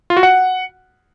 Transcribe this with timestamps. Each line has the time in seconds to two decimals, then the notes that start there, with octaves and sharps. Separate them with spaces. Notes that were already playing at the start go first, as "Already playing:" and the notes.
0.10 F4
0.17 F#4
0.23 F#5